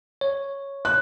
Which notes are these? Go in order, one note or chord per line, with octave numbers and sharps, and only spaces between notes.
C#5
F#6